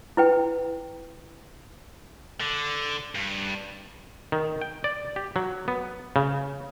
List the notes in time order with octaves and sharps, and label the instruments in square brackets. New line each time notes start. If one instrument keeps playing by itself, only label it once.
[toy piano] E4 B4 G5
[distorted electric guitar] D3
G2
[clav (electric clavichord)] D#3
G5
D5
G4
F#3
B3
C#3